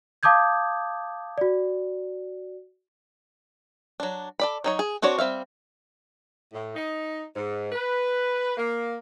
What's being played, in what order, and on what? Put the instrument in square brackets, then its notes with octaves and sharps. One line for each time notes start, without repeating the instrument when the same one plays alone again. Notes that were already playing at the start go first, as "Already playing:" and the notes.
[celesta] F5 A5 D6 D#6 G6 G#6
F#4 D5
[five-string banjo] F#3 D4
A4 D5 B5
F#3 D#4 C#5
G#4
C4 D4 F#4 C#5 D5
G3 C4 E5 F5
[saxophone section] A2
D#4
G#2
B4
A#3